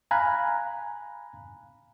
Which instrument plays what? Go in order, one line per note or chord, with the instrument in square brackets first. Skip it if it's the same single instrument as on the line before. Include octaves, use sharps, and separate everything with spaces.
[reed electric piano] F5 G#5 A#5 B5 F#6